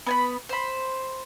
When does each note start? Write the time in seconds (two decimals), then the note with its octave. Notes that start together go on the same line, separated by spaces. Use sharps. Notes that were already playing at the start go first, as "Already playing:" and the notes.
0.06 B3 G#5 B5
0.49 C5 B5